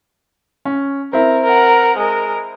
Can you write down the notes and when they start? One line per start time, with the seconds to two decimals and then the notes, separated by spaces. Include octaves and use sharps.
0.65 C#4
1.13 C4 E4 A#4
1.44 A#4 F#5
1.98 G#3 A#4